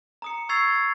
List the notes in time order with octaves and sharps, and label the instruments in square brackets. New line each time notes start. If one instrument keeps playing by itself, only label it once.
[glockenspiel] A#5 D#6 C#7
C#6 E6 G#6 A6 C7 F7